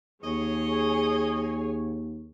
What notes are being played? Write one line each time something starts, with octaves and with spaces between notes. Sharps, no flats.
D#2 G#4 C#5 D#5 G#5